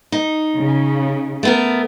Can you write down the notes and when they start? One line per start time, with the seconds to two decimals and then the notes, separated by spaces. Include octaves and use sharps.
0.12 D#4
0.57 C#3
1.43 A3 B3 A#4